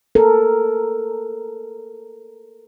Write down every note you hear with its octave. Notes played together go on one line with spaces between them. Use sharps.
A4 A#4